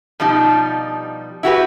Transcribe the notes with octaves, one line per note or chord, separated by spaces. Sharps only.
B2 F3 G3 D#4
E4 F#4 G4 B4